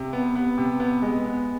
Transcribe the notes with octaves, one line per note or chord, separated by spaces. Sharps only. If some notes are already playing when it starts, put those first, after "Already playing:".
Already playing: C3
B3
B3
C3
B3
G#3
B3